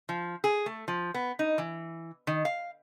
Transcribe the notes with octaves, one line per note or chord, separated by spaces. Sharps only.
F3
G#4
A3
F3
B3
D#4
E3
D#3
F5